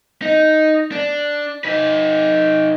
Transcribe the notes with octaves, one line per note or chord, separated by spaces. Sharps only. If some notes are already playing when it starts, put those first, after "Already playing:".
D#4
D4
D#4 B4